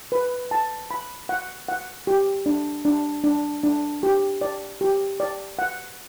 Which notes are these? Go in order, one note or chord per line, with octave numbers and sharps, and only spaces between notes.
B4
A5
B5
F#5
F#5
G4
D4
D4
D4
D4
G4
D5
G4
D5
F#5